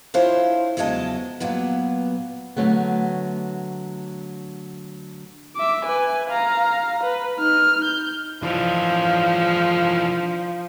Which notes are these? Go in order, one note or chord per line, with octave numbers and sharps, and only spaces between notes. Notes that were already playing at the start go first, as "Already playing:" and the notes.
D4 E4 F4 C5 C#5
E2 C#3 F#3 G#3 D#5 A5
A#2 F#3 B3 B4
D3 F#3 A3 B3
E5 D6
B4 G#5
F5 A#5
B4
D#4 F6
G6
E3 F3 D4